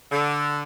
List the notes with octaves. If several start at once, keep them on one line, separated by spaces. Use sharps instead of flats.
D3